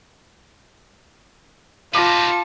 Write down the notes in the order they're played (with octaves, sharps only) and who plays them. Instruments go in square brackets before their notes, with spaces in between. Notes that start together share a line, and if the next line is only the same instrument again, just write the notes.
[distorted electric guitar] D#4 B4 [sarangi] F4 [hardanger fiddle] A5 [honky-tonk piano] D6 A#6